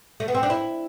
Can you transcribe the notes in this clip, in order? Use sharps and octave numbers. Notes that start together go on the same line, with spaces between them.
A3
B3
C4
D4
E4